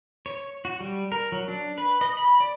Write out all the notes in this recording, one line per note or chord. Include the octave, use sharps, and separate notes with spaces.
C#5
F#4
G3
A#4
F#3
D4
B4
D#5
B5
D5